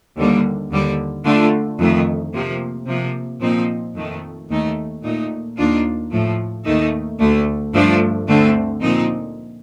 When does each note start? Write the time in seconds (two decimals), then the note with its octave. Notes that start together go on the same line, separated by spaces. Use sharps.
0.17 D#2 D3 G3 A#3
0.71 D#2 D3 G3
1.25 D3 A3 D4 F4
1.79 F2 D#3 A3
2.33 C3 F3 A#3
2.86 C3 F3 A#3
3.41 A#2 F3 C4 D#4
3.95 F2 D#3 A3
4.49 D#2 D#3 A3 D#4
5.03 A#2 A3 D#4
5.57 D#2 D#3 A#3 D4 F4
6.11 A2 F3 A3
6.65 D#2 D#3 A3 D#4
7.19 D2 D3 A3
7.73 G2 F3 A3 D4
8.27 D2 D3 A3 C4
8.81 A#2 F3 C4 D#4